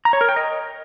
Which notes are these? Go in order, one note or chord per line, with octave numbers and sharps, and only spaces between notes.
A#5
C#5
A#4
G5
D#5